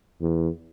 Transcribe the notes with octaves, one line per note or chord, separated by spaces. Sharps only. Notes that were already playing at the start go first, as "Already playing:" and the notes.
E2